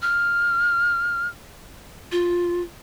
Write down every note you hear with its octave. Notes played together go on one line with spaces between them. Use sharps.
F6
F4